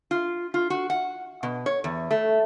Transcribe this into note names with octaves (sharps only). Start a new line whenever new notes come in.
F4
F4
F#4
F#5
B2
C#5
E2
A3